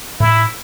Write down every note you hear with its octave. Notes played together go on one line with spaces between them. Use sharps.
A2 E4